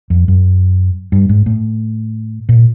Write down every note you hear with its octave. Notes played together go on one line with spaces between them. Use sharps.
F2
F#2
G2
G#2
A2
A#2